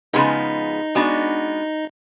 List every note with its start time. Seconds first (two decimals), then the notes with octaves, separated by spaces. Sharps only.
0.14 C#3 F3 G#3 B3 D#4
0.95 G#3 B3 D4 F#4